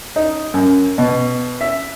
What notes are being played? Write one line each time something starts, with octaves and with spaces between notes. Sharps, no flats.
D#4
F#2
B2
E5